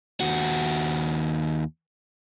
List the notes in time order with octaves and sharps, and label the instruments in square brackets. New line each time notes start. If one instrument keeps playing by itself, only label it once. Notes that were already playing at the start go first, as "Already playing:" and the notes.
[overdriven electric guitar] D#2 F#4